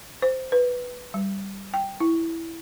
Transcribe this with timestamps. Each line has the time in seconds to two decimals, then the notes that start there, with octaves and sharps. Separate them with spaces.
0.22 C5
0.52 B4
1.14 G3
1.74 G5
2.00 E4